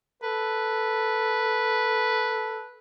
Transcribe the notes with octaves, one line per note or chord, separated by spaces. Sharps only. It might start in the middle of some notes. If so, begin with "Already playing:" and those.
A4 B4